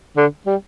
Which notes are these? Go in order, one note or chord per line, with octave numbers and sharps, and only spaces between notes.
D3
G3